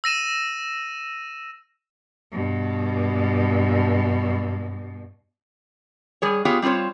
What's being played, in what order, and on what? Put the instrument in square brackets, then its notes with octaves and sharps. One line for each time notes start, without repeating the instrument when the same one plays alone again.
[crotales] E6 A#6 D#7 E7
[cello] G2 B2
[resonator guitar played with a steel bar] G3 G#4 C#5
B3 F4 G4 G#4 C#5
G3 C4 F4 C5 C#5